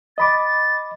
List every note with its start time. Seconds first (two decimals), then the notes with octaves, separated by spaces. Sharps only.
0.18 D#5 B5 D6 A6
0.44 A6